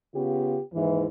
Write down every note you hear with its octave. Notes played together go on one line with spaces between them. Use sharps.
C#3 B3 F4 G4
D#2 G#2 E3